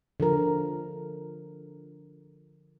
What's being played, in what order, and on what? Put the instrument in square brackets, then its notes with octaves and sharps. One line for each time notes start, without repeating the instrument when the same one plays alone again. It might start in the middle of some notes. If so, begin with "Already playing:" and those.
[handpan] D3 F3 A#4